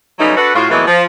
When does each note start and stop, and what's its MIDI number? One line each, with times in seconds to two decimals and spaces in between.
0.19 0.36 49
0.19 0.36 54
0.19 0.36 55
0.19 0.36 57
0.19 0.36 59
0.19 0.36 63
0.37 0.53 62
0.37 0.53 66
0.37 0.53 69
0.37 0.53 71
0.55 0.68 45
0.55 0.68 65
0.55 0.68 66
0.70 0.83 46
0.70 0.83 52
0.70 0.83 54
0.70 0.83 56
0.70 0.83 57
0.70 0.83 59
0.87 1.05 53